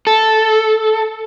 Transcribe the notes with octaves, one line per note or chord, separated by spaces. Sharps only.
A4